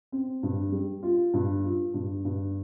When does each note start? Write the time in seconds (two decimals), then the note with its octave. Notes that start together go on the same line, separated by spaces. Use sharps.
0.12 C4
0.43 G2
0.72 G3
1.03 F4
1.34 G2
1.64 F4
1.94 G2
2.25 G2